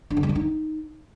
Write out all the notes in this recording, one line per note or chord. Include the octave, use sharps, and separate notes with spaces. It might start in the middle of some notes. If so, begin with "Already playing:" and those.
D4
D3
G3
D3
D#4